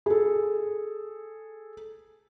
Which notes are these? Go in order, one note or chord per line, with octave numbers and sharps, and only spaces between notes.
G#4 A4